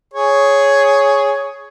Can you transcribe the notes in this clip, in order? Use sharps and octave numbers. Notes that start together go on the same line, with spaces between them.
G#4 C#5